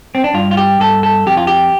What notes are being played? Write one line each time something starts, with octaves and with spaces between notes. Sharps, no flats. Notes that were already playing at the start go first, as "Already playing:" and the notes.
C4
D4
G2 F4
F4
G4
G2 A4
A4
F2 G4
F4
G4